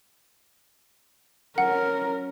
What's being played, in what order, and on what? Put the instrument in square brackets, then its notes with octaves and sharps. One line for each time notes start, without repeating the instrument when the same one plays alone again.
[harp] F#3 C#4 [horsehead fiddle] A#4 [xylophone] F#5